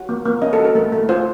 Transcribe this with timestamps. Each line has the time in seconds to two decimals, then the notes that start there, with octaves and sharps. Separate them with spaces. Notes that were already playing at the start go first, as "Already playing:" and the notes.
Already playing: F#4
0.09 A#3
0.25 A#3
0.42 C#4 D#5
0.53 A4
0.59 F#4
0.65 A#4
0.75 A3
0.92 A3
1.09 F4 C5